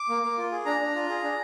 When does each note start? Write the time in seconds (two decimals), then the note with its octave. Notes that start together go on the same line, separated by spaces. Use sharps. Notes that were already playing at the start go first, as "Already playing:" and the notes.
Already playing: D6
0.09 A#3
0.22 A#3
0.38 F4
0.51 G#4
0.66 D4 A#5
0.80 D4
0.95 F4
1.10 G#4
1.24 D4